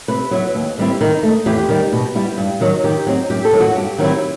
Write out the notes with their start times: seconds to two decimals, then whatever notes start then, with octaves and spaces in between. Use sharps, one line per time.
0.08 C3 B4
0.31 F#3 B3 E4
0.55 D#2
0.78 D#3 G3 C4 E4
1.01 D#3
1.23 A3
1.28 D#4
1.46 E2 G4
1.69 D#3 G3
1.93 B2
2.15 G3 B3 E4
2.38 G2
2.61 D#3 F#3
2.84 D#3 G4
3.07 F#3 C4 D#4
3.30 F#2 G4
3.45 A4
3.53 D#3 F#3
3.60 F#4
3.75 G2 G4
3.98 D#3 F#3 C4 E4